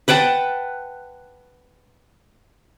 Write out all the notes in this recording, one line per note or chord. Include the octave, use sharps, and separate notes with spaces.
B4 F#5 G5 A5